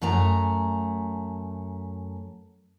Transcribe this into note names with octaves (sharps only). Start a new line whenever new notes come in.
F#2 A3 G#5 A#5